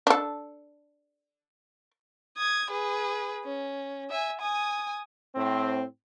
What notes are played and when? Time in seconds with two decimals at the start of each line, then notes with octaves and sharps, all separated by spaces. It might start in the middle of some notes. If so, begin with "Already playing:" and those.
0.07 D4 A4
2.37 D#6 G#6
2.71 G#4 B4
3.45 C#4
4.10 E5 G#5
4.41 G#5 D#6
5.35 A2 C4